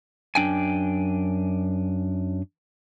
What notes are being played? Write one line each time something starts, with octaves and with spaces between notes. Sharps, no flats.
F#2 D4 G5 G#5